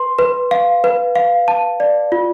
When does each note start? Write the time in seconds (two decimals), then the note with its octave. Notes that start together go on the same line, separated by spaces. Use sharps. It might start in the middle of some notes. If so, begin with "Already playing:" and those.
Already playing: B4 C6
0.19 B4
0.51 F5
0.84 B4
1.15 F5
1.48 A5
1.80 D5
2.12 F4